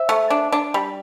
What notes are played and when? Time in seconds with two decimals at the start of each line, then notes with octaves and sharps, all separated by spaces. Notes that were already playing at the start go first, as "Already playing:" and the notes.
Already playing: C5 E5
0.09 A3
0.30 D4
0.52 D4
0.74 G3